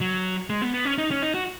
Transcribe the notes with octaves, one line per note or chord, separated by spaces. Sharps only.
F#3
G#3
B3
B3
C#4
D#4
C#4
D#4
F#4